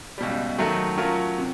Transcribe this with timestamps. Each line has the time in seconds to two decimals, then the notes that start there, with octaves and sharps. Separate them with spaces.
0.18 C#2 B2 G3
0.58 D#3 F#3 A3
0.98 F#3 A3 C#4 F4 A#4
1.38 C3